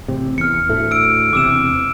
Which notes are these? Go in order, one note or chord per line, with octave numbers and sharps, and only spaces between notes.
A1 C3
E2 F6 C#7
D2 A2 A3
E6 D7
E1 E2 C3 D6 E6 E7